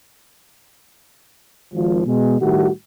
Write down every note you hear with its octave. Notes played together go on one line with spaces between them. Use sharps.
G#1 F3
B2 G#3
A2 D#3 G3 A3 F#4 G4